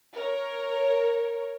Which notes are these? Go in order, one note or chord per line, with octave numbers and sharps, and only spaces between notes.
A#4 C#5